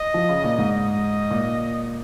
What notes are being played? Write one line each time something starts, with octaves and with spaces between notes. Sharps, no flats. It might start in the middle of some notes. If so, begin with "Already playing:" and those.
Already playing: D#5
F3
C#3
A#2
G#2
D#5
A#2